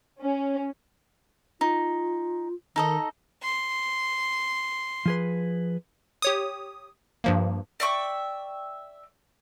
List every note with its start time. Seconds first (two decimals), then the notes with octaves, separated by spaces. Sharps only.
0.20 C#4
1.61 D#4 F4
2.76 D#3 D#4 A4 D#5
3.43 C6
5.06 F3 G#4 B4
6.22 G4 C#5 D#6
7.24 G2 F3 A#3
7.80 D5 E5 G5 C#6